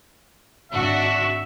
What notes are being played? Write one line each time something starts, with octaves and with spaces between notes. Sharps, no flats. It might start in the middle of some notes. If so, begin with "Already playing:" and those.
G#1 D4 F#4 E5